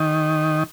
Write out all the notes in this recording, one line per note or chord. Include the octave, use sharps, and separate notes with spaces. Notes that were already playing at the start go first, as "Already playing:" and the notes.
Already playing: D#3